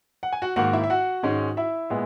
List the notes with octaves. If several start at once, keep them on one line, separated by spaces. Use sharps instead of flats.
F#5
G#5
F#4 F#5
G#2 D#3 A#3 F#4 F#5
E4 E5
E5
F#4 F#5
G#2 D#3 G#3 C#4
E4 E5
A#2 G#3 B3